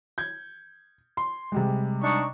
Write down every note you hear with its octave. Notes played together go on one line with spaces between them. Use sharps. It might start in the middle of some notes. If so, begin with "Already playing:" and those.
G6 G#6
C6
C3 G3 G#3
D4 D#4 C#6